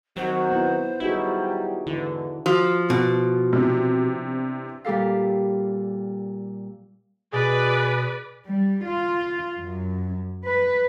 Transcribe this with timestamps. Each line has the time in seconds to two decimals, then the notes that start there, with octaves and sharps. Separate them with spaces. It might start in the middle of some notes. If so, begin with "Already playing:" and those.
0.16 D#3 F#3 C4 F#4 C5
0.51 B3 E4
1.00 F#3 G3 D#4 E4 F#4 G#4
1.87 E2 G#2 D3 E3 E4
2.46 F3 F#4
2.90 B2
3.53 C3 E3 B3 D4
4.85 A#2 G3 G4 A4 F5
7.33 B2 G#4 B4 D5
8.46 G3
8.85 F4
9.59 F#2
10.45 B4